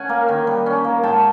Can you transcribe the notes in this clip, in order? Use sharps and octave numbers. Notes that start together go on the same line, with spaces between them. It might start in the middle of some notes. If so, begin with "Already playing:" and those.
Already playing: C#4 F#5 G#5
A#3
D#3
G3
C#4
A#3
G#2 G5 A5